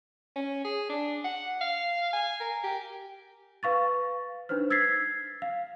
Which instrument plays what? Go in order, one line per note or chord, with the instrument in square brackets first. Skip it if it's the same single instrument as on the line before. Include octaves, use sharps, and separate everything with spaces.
[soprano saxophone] C#4
G#4
D4
F#5
F5
G#5
A#4
G4
[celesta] B4 F5 C#6 A6
D4 D#4 B4 C5 F6
E6 G#6 A6 B6 C7
F5